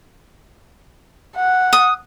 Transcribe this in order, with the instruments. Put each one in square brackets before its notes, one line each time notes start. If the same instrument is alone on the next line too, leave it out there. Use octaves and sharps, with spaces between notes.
[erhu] F#5
[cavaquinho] D#6